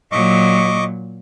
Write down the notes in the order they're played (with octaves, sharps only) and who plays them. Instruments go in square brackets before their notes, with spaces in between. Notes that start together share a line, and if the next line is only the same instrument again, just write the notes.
[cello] A#2 F#3 [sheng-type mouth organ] D#5 C#6 D6